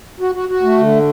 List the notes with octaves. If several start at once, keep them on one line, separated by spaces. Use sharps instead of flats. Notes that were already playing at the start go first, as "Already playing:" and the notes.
F#4
F#4
F#4
A3
D3